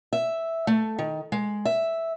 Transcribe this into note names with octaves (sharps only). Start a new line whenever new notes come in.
E5
A3
D#3
G#3
E5